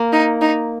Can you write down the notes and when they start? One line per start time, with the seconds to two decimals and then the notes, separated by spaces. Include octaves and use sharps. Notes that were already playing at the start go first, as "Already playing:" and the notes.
Already playing: A#3
0.12 D#4
0.41 D#4